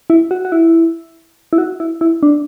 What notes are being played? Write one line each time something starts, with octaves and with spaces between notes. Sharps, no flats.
E4
F#4
F#4
E4
E4
F#4
E4
E4
D4